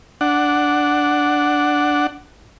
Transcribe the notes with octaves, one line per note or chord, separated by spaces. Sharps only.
D4 F#5